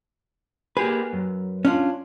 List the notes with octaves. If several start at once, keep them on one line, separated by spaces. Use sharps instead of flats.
A#3 G4 G#4 B4
F#2
C#4 D4 F4